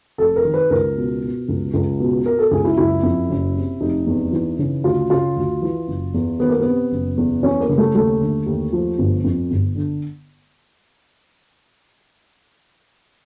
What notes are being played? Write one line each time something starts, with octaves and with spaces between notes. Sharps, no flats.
F1 A4
A#4
D#3
B4
C#2 A#4
B2
B2
C#2
C#2
B2
B2 A#4
A4
C#2 G#4
E4
F#1 E4
F2
F#1
C3
F1 D#4
E2
E3
C#3
D2 F4
C#3 F4
D2
E3
F#1
E2
D#3 B3
A#3
B3
C3
F#1
E2
E3 C#4
A#3
C#3
A3
D#2 A3
D3
D#2
F3
G1
F2
G1
D3